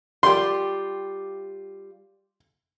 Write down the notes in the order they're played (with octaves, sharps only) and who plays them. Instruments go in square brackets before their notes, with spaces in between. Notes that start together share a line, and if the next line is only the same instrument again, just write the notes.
[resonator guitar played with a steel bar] G3 F4 G4 [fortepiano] C6